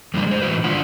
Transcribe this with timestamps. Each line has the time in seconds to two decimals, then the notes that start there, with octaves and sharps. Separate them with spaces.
0.14 F2 A2 C#3 G3 A#3 D4
0.27 G#3 C5
0.42 A2 E3 F#4 B4
0.64 G2 D3 F4 D5 F#5 A5